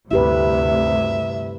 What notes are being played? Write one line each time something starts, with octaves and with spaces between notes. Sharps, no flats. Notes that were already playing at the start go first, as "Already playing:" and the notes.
D2 G2 C3 E4 G4 B4 E5